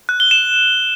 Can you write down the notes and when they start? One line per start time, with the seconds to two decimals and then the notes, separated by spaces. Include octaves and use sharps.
0.09 F#6
0.20 G7
0.31 E7